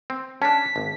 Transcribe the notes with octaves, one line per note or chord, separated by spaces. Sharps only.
C4
C#4 D4 A5 B6
G#1